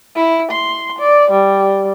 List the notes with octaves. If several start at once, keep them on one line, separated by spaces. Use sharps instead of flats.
E4
C6
D5
G3